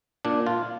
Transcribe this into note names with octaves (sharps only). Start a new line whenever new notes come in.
A#2 D4
F4